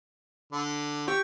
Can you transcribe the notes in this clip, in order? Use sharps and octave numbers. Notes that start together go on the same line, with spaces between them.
D3
G4 C#6